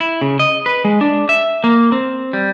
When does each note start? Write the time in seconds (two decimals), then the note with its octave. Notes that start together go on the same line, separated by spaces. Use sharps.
0.01 E4
0.22 C#3
0.39 D#5
0.66 B4
0.85 G#3
1.01 D4
1.29 E5
1.64 A#3
1.92 C4
2.33 G3